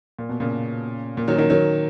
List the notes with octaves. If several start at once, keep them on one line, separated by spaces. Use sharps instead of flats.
A#2
B2
A#2 C#3
A#2
D#3 F#3
D#3 F#3
D#3 F#3